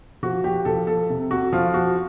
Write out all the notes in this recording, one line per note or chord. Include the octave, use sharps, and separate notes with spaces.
F3 F#4
G4
F3 A4
A4
C3
F#4
F3 F4
F#4